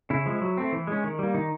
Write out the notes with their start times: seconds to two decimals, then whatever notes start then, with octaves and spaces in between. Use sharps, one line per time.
0.10 C#3 E4
0.25 F3 G#3
0.41 F#3
0.58 A3 C4
0.72 E3
0.87 G#3 C#4
1.04 D#3
1.19 G3 A#3
1.34 D#3 D#4